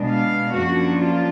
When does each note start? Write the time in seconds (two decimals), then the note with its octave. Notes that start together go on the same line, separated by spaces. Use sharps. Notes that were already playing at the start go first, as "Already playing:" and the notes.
Already playing: B2 G#3 B3 D4
0.10 F5
0.55 F#2 F3 A#3 D4 F#4
1.01 F4